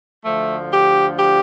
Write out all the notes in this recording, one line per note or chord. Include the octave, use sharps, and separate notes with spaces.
D2 D3 F3 A3
G4
G4